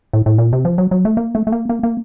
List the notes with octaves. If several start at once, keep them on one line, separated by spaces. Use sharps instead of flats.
A2
A2
A#2
C3
F3
F#3
F#3
A3
A#3
A3
A3
A#3
A#3
A#3